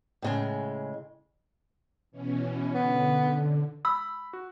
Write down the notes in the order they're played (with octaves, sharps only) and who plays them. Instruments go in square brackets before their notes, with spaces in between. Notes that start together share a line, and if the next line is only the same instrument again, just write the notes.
[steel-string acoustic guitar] A2 C#3 G#3
[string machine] B2 E3 C#4
[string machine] D3 [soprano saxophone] B3
[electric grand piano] B5 [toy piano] E6
[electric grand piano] F#4